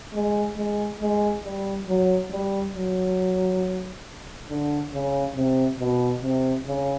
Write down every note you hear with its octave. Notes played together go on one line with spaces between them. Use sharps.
G#3
G#3
G#3
G3
F#3
G3
F#3
D3
C#3
C3
B2
C3
C#3